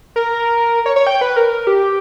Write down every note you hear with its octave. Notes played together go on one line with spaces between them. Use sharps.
A#4
C#5
C#5
G5
B4
A#4
G4